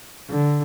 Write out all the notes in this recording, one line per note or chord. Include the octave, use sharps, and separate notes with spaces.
D3